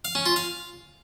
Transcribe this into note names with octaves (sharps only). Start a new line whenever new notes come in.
F5
C#4
F4
F5